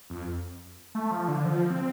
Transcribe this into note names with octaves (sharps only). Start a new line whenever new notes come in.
F2
A3
F3
D3
F3
C4